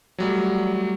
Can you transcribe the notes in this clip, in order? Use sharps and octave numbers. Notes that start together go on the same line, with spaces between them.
F#3 G3 A3